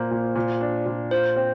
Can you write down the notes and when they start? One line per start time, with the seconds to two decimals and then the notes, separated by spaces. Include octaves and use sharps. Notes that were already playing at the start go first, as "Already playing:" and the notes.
Already playing: A#2 A#3 C5
0.11 A#2
0.35 A#2
0.61 D4
0.86 A#2
1.11 F4 C5
1.36 C4